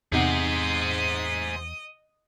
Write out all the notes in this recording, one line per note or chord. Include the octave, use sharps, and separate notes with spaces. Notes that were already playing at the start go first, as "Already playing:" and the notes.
E2 C3 D#4 G#4 C5 D#5 F#5 D#6